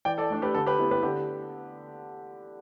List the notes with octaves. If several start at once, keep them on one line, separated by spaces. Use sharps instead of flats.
E3 D5 G5
A4 D5
A3 D4
G4 B4
D3 A4
G4 B4
B3 E4
G4 B4
D3 G4